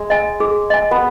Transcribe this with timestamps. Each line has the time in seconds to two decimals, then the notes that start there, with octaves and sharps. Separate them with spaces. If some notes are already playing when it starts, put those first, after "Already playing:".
Already playing: G#3
0.10 D#5 G#5
0.40 G#4
0.70 D#5 G#5
0.91 B3